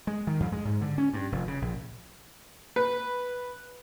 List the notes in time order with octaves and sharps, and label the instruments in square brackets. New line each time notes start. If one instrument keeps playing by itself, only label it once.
[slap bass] G#3
D#3
F2
G#3
G#2
D3
C#4
G2
F1
C#3
A#1
[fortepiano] B4